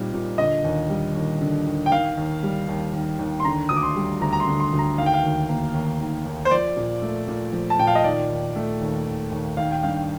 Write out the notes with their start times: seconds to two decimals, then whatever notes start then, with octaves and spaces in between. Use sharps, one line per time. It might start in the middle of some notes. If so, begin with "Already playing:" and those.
Already playing: A#2 G3 C4 D#4
0.13 A#2
0.38 D3 D#5
0.64 D#2
0.90 G3
1.15 D#2
1.41 D3
1.67 D#2
1.86 G5
1.92 D#3 F5
2.17 D#2
2.43 G3
2.68 D#2
2.93 D#3
3.19 D#2
3.40 C6
3.45 D3 A#5
3.69 D2 D#6
3.76 D6
3.83 C6
3.96 G3
4.21 D2 A#5
4.33 A#5
4.40 C6
4.47 D3
4.60 C6
4.73 D2
4.79 A#5
4.98 D#3 F5
5.06 G5
5.14 F5
5.23 D#2
5.49 A#3
5.74 D#2
5.99 D#3
6.26 D#2
6.45 C5
6.51 F3 D5
6.77 A#2
7.02 A3
7.28 A#2
7.53 F3
7.70 A5
7.79 A#2 G5
7.87 F5
7.95 D#5
8.04 D#3 D5
8.30 D#2
8.56 A3
8.81 D#2
9.06 D#3
9.31 D#2
9.57 D#3 F5
9.71 G5
9.83 G2 F5